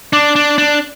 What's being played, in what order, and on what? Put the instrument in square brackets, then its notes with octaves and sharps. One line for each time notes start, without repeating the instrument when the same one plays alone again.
[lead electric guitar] D4 [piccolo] D6
[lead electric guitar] D4
D4